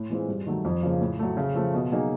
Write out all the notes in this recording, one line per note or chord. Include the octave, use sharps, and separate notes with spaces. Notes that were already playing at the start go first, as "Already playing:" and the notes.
Already playing: A2
E3 G#3 C4 F4
G2
D#3 F#3 A3
F2
C#3 F3 A#3
A2
F#3 A3
C#3
F3 A3
B2
F#3 A#3 D#4 G#4